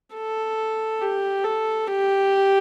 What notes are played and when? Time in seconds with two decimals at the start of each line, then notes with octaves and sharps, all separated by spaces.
0.15 A4
1.01 G4
1.44 A4
1.87 G4